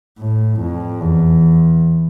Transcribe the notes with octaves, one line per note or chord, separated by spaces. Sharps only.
A2
F2
E2